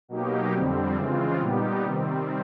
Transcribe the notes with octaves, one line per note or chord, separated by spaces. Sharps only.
B2 F#3 A#3 D#4 G4
F2 D3 G3 C4
C#3 E3 G#3 C4 F4
A#2 G3 B3 D#4 G4
C3 D#3 G3 C4